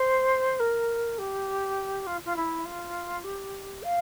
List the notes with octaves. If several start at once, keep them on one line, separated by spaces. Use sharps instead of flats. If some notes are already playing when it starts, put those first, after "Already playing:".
Already playing: C5
A#4
G4
F4
F4
E4
F4
G4
F5